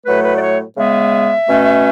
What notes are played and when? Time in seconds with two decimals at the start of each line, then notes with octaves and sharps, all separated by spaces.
0.05 A2 F#3 A3 B4
0.23 B4
0.36 D5
0.41 C#5
0.77 C#3 G#3 B3 E5
1.48 B2 A3 C#4